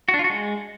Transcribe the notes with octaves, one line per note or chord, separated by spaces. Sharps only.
F#4
D4
F4
F#4
G#3